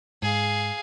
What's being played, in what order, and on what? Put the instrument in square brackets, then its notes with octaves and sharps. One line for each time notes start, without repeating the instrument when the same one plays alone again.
[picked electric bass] G#2 [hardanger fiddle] G#4 F5